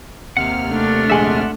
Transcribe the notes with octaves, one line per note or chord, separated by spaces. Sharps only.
D#2 C3 A#3 F#5 F6
A3 D4
A#1 G#3 E5 F#5 G#5 C6